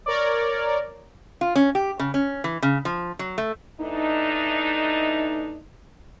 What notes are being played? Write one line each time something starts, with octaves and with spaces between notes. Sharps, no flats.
A#4 C#5 D5
F4
C#4
G4
C#3
C#4
E3
C#3
F3
F#3
A3
E3 A3 D4 D#4